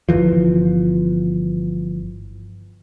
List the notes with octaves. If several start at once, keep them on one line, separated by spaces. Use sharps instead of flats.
G1 D2 E3 F3